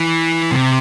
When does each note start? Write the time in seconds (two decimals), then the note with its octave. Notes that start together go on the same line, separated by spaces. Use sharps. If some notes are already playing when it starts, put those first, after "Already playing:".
Already playing: E3
0.52 C3